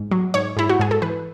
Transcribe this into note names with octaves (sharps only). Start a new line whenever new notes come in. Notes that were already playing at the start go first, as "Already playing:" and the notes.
Already playing: G#2
F#3
G#2 C#5
G#2 E4
F#4
G#2 G#4
A4
E3 B4